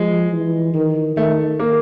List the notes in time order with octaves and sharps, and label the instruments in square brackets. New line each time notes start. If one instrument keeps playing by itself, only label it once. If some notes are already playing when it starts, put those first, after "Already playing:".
Already playing: [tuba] F3 [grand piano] G#3
[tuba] E3
D#3
[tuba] D#3 [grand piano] A3
[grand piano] A#3